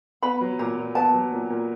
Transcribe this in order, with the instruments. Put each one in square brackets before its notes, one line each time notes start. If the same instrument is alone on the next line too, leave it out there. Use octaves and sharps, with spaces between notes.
[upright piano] B3 [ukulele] B5
[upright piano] F#3
[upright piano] A#2 [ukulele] A#5
[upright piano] A#2
[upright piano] B3 [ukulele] A5
[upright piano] F#3
A#2
A#2